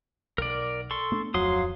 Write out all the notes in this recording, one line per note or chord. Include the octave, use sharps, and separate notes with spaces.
B1 A#4 D5
A4 C6 C#6
A3 B3 D4
D1 F2 F3 F#3 F5 C6 D#6